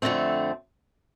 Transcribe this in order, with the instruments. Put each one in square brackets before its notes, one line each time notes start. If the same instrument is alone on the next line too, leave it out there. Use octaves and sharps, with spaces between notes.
[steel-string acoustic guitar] F2 D3 A3 C4